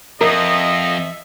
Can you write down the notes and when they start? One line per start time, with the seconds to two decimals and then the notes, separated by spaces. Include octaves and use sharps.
0.21 F2 A#4 D#5 E5